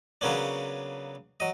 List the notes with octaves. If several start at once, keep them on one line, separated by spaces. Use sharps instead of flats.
C#3 F#3 A#3 B3 C#4 D4
F#3 D#5